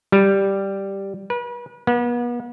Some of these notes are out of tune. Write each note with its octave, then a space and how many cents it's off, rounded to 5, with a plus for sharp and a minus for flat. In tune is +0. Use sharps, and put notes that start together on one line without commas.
G3 +0
B4 -35
B3 -40